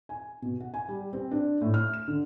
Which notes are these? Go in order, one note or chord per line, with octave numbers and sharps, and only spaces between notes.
G#5
B2
F#5
G#5
G3
C4
D4
A2
F6
E7
D3